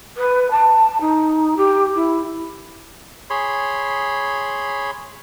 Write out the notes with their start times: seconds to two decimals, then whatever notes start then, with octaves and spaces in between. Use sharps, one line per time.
0.17 B4
0.51 A5
1.01 D#4
1.57 G4
1.95 E4
3.30 G#4 C#5 B5 C6